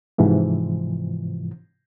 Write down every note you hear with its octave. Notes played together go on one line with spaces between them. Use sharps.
G#2 C3 E3 F3